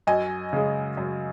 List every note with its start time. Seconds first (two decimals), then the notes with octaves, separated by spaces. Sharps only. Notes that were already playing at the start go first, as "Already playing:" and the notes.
0.07 F#2 D#5 G#5
0.53 C#3 G#3
0.97 F#2